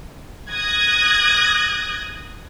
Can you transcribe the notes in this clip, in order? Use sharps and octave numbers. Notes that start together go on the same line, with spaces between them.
D#6 F#6 G#6 A#6